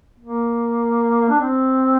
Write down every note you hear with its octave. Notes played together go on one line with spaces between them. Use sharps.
A#3
D4
C4